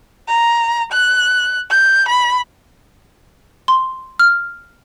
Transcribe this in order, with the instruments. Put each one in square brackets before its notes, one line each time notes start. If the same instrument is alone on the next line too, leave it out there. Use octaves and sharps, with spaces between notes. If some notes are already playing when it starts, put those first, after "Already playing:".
[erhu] A#5
F#6
G6
B5
[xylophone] C6
F6